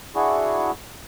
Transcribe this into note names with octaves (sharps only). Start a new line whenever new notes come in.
D4 E4 F#4 G#4 C#6